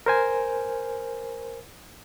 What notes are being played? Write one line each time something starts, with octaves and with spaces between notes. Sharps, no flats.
A#4 C5 G#5